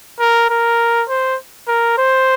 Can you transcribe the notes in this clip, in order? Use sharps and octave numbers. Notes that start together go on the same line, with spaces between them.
A#4
A#4
C5
A#4
C5